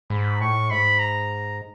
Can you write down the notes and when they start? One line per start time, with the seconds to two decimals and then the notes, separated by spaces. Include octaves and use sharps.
0.10 G#2 B5
0.40 A2 C#6
0.70 G#2 B5
0.99 A#5